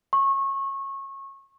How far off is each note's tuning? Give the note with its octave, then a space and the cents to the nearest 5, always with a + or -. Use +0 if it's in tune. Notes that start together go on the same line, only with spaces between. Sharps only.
C#6 -25